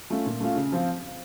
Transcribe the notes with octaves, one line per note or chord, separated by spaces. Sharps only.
A3 C#4 F4
A#2
A3 C#4 F4
C#3
F3 C4 F4